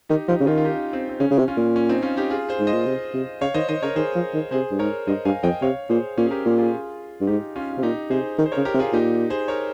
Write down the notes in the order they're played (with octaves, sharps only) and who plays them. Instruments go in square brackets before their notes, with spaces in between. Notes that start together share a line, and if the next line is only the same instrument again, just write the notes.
[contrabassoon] D#3 [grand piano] D#4 G4
[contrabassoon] F3 [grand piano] D#4 G4
[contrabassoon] C#3
[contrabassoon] D#3 [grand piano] C#4 F4
[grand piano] F4
D#4 G4
C4
C4
[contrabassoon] C#3 [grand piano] C#4
[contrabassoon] C#3
C3
[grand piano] C#4 F4
[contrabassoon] A#2
[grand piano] C#4
C4 D#4
C#4 F4
D#4 G4
F4 G#4
G#4 C5
[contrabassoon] G#2
[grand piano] C5 D#5
[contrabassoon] A#2
C3
C3
[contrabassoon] C#3 [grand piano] C#5 F5
[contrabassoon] D#3 [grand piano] C5 D#5
[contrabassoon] D#3 [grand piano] C5 D#5
[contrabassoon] C#3 [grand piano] A#4 C#5
[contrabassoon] D#3 [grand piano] G#4 C5
[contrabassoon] F3
D#3
[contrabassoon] C3 [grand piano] G#4 C5
[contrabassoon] G2
[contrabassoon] G#2 [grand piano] A#4 C#5
[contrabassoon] G2 [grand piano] C5 D#5
[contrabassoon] G2 [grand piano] F5 G#5
[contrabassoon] F2 [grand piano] D#5 G5
[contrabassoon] C3 [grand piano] C#5 F5
[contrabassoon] A#2 [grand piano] G#4 C5
[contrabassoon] A#2 [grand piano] C#4
[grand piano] G#4
G4 A#4
[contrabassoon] A#2
[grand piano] F4 G#4
[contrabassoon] G2
[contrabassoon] G#2 [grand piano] D#4 G4
[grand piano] C#4 F4
F4
[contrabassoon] C3
[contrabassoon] A#2 [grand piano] D#4 G4
[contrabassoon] C3 [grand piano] G#4 C5
[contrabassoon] D#3
[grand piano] C5
A#4 C#5
[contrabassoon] C#3
[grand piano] G4 A#4
[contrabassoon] C3
[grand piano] F4 G#4
[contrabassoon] A#2 [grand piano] D#4 G4
[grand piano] G#4 C5
A#4 C#5